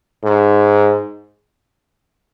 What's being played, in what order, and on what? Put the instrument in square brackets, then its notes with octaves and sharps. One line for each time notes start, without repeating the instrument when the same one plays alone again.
[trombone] G#2